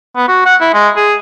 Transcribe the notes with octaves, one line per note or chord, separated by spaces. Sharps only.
B3
F#4
F#5
E4
G#3
G#4